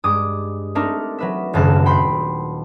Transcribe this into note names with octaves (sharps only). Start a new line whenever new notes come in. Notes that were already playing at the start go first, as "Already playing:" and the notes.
G2 G#3 D6 D#6
A3 C4 D4 D#4 A#4
F#3 B4 E5
D#1 G#1 F#2 C#3 A5 F#6
G5 B5 C6 G6 C7